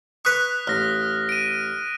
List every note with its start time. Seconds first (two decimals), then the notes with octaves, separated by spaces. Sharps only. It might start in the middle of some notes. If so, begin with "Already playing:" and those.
0.25 B4 C#6 D#6 F#6 B6
0.67 A1 F6 A#6
1.29 D7 D#7